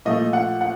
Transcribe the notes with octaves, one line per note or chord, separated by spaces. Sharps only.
A#2 F3 A3 D#5
F#5
F#5